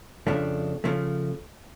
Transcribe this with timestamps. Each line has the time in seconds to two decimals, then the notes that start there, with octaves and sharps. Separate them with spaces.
0.27 F2 C#3 F3 A3 D4
0.84 C#3 F3 A3